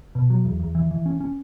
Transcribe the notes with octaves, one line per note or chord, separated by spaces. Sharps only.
B2
F#3
E2
E2
E3
E3
C#4
C#4